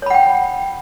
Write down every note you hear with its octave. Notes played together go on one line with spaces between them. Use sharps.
C#5 F#5 G5 B5